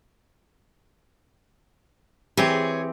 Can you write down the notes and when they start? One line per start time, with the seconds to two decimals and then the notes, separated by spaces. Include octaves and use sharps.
2.37 E3 C4 G4 G#4 C#5